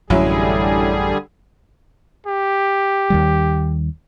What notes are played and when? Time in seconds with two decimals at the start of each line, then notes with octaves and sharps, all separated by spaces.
0.10 A1 F#2 D3 F#3 G3 C#4 E4 G#4
2.27 G4
3.10 D#2 D#3 G3